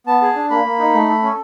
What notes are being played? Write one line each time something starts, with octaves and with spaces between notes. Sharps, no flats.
B3 A5
G#4
D4
A#3 B5
A#3
D#4
A3
A4
C#4